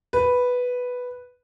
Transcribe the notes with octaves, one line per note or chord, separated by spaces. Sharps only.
B4